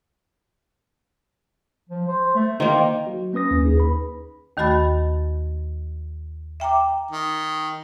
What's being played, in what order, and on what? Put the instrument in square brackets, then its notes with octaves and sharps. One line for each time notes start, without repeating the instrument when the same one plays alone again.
[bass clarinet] F3
C5
A3
[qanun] D#3 A#3 [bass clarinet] C5
[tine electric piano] F#3 F#4
A#3 C#4 B4 D#6 A#6
D#2 C#4
D#2 D#4 G#4
B4 B5
[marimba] D#2 D#3 A3 F#4 B5 A6
E5 G5 A#5 D6
[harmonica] D#3